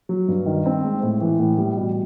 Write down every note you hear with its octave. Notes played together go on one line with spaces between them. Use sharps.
F#3
G2
D#3
C4
G#3
A2
E3
A2
G3
B2